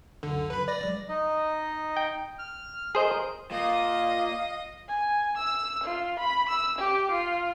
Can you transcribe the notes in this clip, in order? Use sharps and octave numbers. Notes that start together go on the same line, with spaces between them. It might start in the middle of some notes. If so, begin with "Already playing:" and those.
C#2 F#2 D3
F#3 B4 B5
D5 A#6
F#3 G#3
D#4 D#5
G5
F6
G#4 A#4 C5 D#5 G6
A#2 D#5 F5
G#5
E6
F4
B5
E6
G4
F4